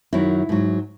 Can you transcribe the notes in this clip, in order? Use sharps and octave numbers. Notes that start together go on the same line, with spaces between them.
F#2 D#3 F#3 E4
G#2 F#3